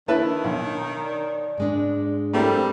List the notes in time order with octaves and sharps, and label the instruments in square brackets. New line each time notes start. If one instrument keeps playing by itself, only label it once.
[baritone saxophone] D#3 [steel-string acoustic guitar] A#3 [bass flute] D4 [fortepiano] E4 B4 A5
[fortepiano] B1 [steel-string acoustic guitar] C#5
[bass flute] D5
[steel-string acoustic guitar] G#2 G#3 D4
[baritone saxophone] G3 [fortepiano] A3 C4 A#4 [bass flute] C5